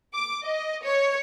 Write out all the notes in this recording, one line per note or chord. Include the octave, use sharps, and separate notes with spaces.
D6
D#5
C#5